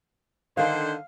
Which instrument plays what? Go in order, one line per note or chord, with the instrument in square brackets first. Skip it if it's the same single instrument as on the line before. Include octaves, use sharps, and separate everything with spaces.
[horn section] D3 D#3 C5 [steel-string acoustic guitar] F5